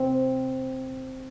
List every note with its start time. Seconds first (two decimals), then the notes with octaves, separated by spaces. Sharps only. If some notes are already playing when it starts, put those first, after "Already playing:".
Already playing: C4